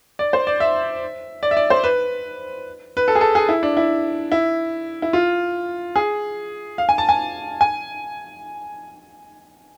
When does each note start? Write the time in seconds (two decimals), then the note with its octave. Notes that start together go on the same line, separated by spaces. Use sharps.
0.19 D5
0.33 C5
0.47 D5
0.60 E5
1.43 D5
1.51 E5
1.57 D5
1.70 C5
1.84 B4
2.97 B4
3.08 A4
3.15 G#4
3.21 A4
3.35 G#4
3.49 E4
3.63 D4
3.77 E4
4.32 E4
5.02 E4
5.13 F4
5.96 G#4
6.78 F5
6.89 G#5
6.98 A5
7.09 G#5
7.61 G#5